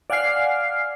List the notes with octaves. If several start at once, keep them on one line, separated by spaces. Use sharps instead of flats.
D5 F5 F#5 G#5 F6 C7